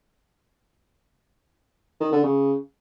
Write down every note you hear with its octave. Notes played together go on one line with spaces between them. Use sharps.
D#3
D3
C#3